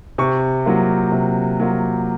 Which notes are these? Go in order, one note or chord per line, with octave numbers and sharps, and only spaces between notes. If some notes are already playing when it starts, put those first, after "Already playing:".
C3 C#6
F#3 A#3 F4
C3
F#3 A#3 F4